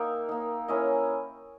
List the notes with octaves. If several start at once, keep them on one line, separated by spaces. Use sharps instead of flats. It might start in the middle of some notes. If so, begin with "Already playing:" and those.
Already playing: A#3 D#4 E5 G5
A#3 D#4
A#3 C#4 E4 D#5